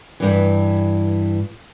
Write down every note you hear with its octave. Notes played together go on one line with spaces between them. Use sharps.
G2 E3